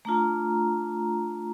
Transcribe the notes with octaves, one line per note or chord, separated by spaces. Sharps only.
A3 D4 F4 A#5